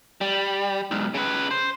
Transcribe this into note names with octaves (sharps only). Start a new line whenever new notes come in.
G3
B1 G#2
C#3 B4
C5